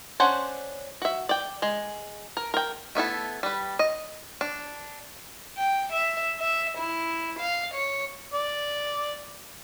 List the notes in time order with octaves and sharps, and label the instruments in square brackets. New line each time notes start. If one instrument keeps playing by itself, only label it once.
[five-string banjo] C#4 D4 C5 F#5
F#4 E5
D5 G5
G#3
A#4
A#4 G5
A3 B3 E4 A4
G3 B4
D#5
D4
[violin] G5
E5
E5
E4
F5
C#5
[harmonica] D5